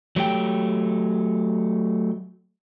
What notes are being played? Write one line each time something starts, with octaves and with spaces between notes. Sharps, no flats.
F#3 A3 G4 G5